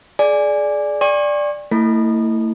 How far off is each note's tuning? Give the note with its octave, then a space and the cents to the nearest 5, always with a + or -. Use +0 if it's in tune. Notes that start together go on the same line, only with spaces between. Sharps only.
G#4 +25 D5 +0 G#5 +0
D5 +0 G5 +45 C#6 -35
A3 +45 E4 -5 A4 +0